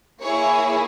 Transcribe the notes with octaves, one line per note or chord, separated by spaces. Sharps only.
A#3 E4 G#4 C#5